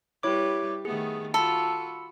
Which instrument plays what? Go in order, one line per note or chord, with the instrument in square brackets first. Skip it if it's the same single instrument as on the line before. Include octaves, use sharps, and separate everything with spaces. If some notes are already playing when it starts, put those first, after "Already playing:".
[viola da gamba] G3 G4 B4 [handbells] E4 C#5 D6
[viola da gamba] D#3 A3 B3 [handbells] G#4
[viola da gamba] F4 F#4 [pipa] A4 [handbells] B5 E6 C#7